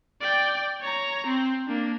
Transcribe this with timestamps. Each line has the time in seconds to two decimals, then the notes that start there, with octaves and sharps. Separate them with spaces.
0.21 D5 G5
0.81 C#5 A#5
1.26 C4
1.67 A#3 D4